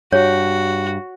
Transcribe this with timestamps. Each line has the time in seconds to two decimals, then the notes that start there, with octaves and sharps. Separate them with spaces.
0.12 G2 F#4 C#5